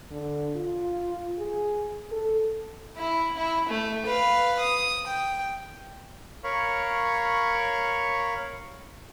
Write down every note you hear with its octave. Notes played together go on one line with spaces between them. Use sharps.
D3
F4
G#4
A4
E4
E4
A3
B4 F5
D#6
G5
A#4 C#5 F5 B5 C#6